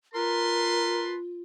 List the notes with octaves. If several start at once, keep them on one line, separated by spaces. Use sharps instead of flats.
F4 A#4 B4 A5 C6